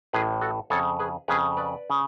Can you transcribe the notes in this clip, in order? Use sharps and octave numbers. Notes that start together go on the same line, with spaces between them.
A1 A2 G#4 B4
F#4 A4
F2 C#3 A4 C#5
G#4 B4
F2 C#3 G#4 B4
B4 D5
C#3